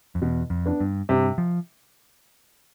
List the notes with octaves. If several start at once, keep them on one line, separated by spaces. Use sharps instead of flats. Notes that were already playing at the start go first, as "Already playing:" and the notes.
F2
E2 B2
F2
B3 D4
G2
G2 C3
F3